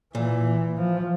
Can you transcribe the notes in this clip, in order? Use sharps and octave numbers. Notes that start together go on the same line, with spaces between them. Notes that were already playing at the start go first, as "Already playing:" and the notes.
A#2 E3
F3